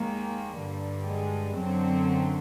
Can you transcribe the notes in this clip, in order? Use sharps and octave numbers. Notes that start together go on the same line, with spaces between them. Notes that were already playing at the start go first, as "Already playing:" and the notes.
Already playing: D#2 D#3 G#3 A#3
G2 D3 G3
G#3
F#2 D3 F#3 C4